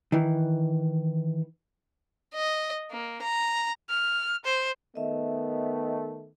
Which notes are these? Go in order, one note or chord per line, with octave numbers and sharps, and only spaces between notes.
D#3 E3
D#5
A#3
A#5
F6
C5
D#3 A3 B3 D#5 E5